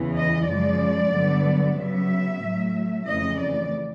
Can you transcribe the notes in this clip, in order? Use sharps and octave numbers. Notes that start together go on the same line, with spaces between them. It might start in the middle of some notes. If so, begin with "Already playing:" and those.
Already playing: E2 C#3 E3
D#5
F#2 C#3 F3 G#3 D5
G2 D3 F#3 B3
C#3 F#3 B3 E5
A2 F#3 A3
F2 C#3 E3 A3 D#5
D5